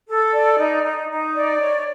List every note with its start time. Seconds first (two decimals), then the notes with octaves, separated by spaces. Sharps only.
0.09 A4
0.34 D5
0.59 D#4
0.84 D#4
1.10 D#4
1.35 D5
1.59 C#5